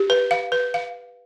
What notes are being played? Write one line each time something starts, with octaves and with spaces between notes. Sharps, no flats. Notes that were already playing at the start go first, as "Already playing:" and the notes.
Already playing: G4
B4
F5
B4
F5